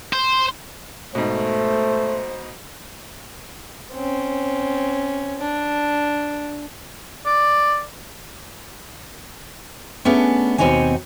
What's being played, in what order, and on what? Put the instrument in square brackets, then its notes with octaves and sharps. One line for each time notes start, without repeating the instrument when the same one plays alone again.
[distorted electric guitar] C5
[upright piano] G#2 B2 [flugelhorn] A3 [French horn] C5
[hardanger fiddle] C4 C#4
D4
[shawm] D5
[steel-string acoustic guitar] A3 B3 C#4 D4 G#4
D#2 B2 C4 D#4 C#5 G#5